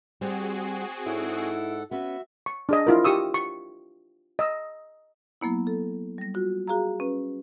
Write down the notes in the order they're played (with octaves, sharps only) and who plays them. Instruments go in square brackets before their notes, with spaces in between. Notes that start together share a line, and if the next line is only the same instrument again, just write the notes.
[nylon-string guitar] G3 [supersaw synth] C4 F#4 G#4
[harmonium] G#2 A4 F#5 [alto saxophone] E4 [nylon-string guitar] C#5 D5
[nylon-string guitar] B3 C#4 B4 [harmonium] F#4 E5
[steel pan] C#6
D4 G#4 D#5
E4 F4 A#4
G4 C#6 D#6 E6
C#6
D#5 E6
[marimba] F#3 A#3 B3 E4
A4
G3 A#6
F4 F#4
F#4 G#4 F5 A#5
C#4 B4